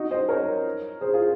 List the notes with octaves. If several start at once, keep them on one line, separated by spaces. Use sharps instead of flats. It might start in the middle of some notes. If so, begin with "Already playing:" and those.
Already playing: D#4 F#4
C5 D#5
A#4 C#5
G#4 C5
F4 G#4